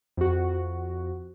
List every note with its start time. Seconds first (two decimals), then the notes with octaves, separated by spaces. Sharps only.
0.17 F2 F#4